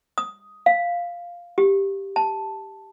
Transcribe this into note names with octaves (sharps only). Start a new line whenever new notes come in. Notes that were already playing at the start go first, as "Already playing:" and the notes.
D#6
F5
G4
A5